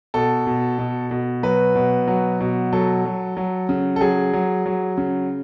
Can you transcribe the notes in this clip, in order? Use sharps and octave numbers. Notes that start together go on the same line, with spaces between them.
B2 A4
B2
B2
B2
F#3 B4
B2
F#3
B2
F#3 A4
F#3
F#3
C#3
A4
F#3 G#4
F#3
F#3
C#3